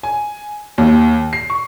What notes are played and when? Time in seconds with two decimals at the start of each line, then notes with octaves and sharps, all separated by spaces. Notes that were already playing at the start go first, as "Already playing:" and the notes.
0.03 G#5
0.78 D#2
1.33 C7
1.50 C#6